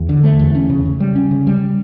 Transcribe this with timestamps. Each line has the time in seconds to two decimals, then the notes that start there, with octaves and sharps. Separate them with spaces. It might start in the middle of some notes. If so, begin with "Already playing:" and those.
Already playing: E2
0.09 D3
0.24 A3
0.39 E2
0.55 C#4
0.70 C#3
0.85 C#3
1.00 G3
1.15 C#4
1.31 C#3
1.47 G3